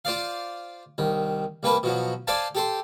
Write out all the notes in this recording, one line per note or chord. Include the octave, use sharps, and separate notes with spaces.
F4 C5 D5 F5
C2 D#3
C2 A#3 B4 A5 B5
B2 F3 F#3
A4 C5 D5 F5 G#5 A5
G4 A4 C5